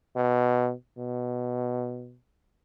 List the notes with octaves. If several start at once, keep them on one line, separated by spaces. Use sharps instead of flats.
B2
B2